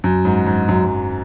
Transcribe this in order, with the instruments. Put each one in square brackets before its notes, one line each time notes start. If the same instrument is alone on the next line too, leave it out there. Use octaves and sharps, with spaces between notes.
[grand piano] F#2
G#2
G#2
F#2
F#2